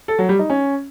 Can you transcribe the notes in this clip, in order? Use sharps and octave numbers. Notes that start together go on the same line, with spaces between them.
A4
F#3
G3
D#4
C#4